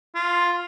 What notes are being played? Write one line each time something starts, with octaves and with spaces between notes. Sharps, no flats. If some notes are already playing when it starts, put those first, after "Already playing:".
F4